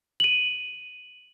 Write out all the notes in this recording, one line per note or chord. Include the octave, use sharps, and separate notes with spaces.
D#7 F#7